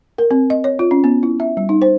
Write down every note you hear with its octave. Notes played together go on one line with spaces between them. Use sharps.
A#4
C4
D#5
C#5
F4
C#4
B3
E4
E5
G3
D#4
C5